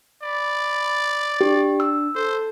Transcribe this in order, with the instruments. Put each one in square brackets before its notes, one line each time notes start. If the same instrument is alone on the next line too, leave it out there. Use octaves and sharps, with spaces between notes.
[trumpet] D5 [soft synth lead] B5
[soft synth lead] D4 [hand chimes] G4
[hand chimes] E6
[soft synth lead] A4 [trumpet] C5